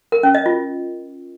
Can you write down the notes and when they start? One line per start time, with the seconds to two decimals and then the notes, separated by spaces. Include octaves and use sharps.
0.12 A#4
0.23 C#4
0.35 D#5
0.46 F4